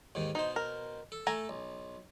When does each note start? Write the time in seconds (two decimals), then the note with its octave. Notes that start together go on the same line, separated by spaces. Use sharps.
0.15 D#2 G#2 D#3
0.35 B2 D#4 C5
0.56 A#4
1.12 A4
1.27 A3 A4 G#5 A#5
1.49 B1